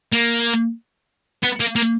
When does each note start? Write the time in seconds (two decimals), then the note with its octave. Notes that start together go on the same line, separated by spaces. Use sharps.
0.13 A#3
1.43 B3
1.60 A#3
1.76 A#3